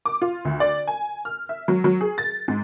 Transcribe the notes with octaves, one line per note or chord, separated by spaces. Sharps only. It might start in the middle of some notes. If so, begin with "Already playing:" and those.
D6
F4
D2
D5
G#5
F6
E5
F#3
F#3
G#4
A6
G#2